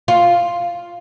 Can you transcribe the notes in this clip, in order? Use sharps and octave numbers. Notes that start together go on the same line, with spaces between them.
F4